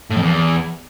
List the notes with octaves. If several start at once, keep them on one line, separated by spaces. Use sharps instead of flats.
A2
F2
E2